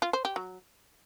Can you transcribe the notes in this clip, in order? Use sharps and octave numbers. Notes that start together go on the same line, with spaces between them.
F4
C5
G4
F#3